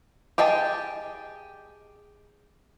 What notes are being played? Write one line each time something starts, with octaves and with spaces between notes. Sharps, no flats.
G4 G#4 D#5 G5 A5